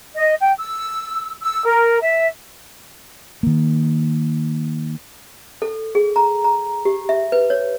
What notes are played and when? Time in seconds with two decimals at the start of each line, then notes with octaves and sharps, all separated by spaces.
0.15 D#5
0.40 G5
0.58 E6
1.43 E6
1.65 A#4
2.02 E5
3.43 D#3 A#3
5.62 A4
5.95 G#4
6.16 A#5
6.44 A#5
6.85 G4
7.09 E5
7.32 B4
7.50 C#5